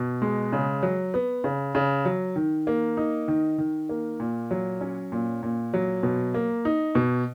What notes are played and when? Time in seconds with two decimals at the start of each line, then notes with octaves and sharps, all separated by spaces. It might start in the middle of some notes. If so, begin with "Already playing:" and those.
Already playing: B2
0.22 G#3
0.53 C#3
0.83 F#3
1.14 B3
1.44 C#3
1.75 C#3
2.05 F#3
2.36 D#3
2.67 A#3
2.97 D#4
3.28 D#3
3.58 D#3
3.89 A#3
4.20 A#2
4.51 F#3
4.81 C#4
5.12 A#2
5.43 A#2
5.74 F#3
6.03 B2
6.34 A#3
6.65 D#4
6.95 B2